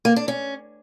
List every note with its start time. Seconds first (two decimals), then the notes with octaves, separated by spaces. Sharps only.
0.05 A#3
0.16 D4
0.28 C#4